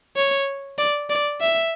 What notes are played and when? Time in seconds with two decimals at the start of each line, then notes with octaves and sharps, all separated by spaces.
0.16 C#5
0.78 D5
1.10 D5
1.41 E5